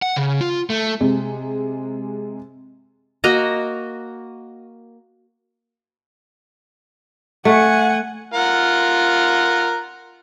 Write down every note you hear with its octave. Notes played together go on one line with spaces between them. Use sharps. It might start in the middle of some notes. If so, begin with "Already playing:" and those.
F#5
C#3
F4
A3
C3 G#3
A#3 F#4 D#5 A#5
A3 F#5 G#5
F4 A#4 F#5